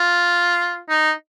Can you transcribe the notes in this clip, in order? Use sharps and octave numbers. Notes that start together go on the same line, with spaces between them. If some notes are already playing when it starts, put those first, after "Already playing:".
Already playing: F4
D#4